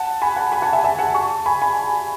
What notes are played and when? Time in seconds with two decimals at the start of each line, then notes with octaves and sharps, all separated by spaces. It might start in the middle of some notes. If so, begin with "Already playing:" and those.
Already playing: F#5 A5
0.22 G#5 B5
0.36 F#5 A5
0.52 G#5 B5
0.62 F#5 A5
0.73 E5 G#5
0.84 E5 G#5
0.99 F#5 A5
1.14 A5 C#6
1.46 G#5 B5
1.62 G#5 B5